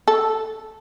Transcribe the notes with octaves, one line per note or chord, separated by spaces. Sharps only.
A4